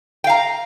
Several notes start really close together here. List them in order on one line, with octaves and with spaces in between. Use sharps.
G5 F5 A#5